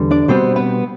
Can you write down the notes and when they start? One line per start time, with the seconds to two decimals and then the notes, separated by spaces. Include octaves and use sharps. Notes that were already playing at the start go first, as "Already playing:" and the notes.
Already playing: E2 D3 G3
0.11 D4 D5
0.28 B2 G3 B3 C4 C5
0.56 B3 B4